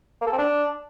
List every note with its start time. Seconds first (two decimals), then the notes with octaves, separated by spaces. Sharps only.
0.21 A#3
0.27 A4
0.33 C4
0.38 D4